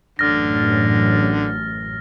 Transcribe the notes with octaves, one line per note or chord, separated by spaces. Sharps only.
A1 F#2 A2 D3 F6 A6 A#6